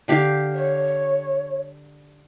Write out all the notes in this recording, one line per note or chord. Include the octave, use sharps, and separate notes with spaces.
D3 G4 F5
C#5